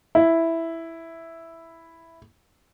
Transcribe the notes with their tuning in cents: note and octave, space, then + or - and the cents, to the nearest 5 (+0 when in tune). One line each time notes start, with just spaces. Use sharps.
E4 +0